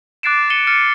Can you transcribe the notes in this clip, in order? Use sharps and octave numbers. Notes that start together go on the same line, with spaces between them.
D6 F#6 A6 C7 D7 E7
C#7 D#7 E7 G7
F6 A6 C#7 D#7